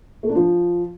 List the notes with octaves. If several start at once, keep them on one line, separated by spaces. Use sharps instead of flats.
A3
D4
F3